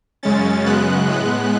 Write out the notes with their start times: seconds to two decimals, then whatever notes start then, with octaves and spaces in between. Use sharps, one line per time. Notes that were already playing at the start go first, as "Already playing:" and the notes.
0.23 F#2 C#3 G#3 C#4 A6
0.66 F#2 C#3 G#3 B3 F#6
1.08 A2 G#3 B3